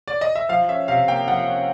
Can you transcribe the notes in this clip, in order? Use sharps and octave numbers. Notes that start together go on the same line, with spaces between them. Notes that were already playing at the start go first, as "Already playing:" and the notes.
D5
D#5
E5
F3 F5
C#4 E5
C3 F5
A#3 G5
F3 F#5
C#4